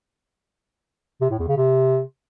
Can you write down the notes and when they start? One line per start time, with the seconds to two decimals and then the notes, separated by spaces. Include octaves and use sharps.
1.21 C3
1.30 A2
1.39 E2
1.48 C#3
1.57 C3